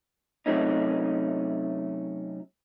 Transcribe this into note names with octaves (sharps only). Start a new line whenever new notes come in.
C3 F#3 A3 C#4 D#4